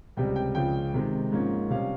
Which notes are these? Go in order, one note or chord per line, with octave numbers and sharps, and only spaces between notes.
C#2 C3 G3 G5
G5
C#2 C#3 F3 G5
C3 D#3 G#3
G#2 F3 A#3 C#4
C3 G3 C#4 F5